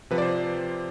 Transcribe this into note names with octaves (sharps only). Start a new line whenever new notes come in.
C3 F3 B4
D5
C5